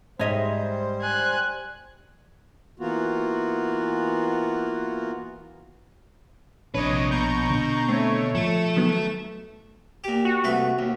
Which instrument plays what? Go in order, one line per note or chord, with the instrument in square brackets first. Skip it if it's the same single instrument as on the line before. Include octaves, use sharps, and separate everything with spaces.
[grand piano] G#2 [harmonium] G3 C5 [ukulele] C#5 D#5 E5
[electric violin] G#5 F#6
[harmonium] E3 A#3 B3 F4 F#4
[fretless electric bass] A#1 D4 [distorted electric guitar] C3 B4 [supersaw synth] C#5 D#5
[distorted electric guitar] B2 [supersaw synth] A#5 C#6 G6
[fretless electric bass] D3
[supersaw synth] A3 C#5 [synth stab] C4
[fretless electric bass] F3 [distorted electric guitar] A3 A4 [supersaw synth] E7
[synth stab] D#3 F#3 B3
[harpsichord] A#2 G4
[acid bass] F#4
[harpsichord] C2 A3 B4
D#2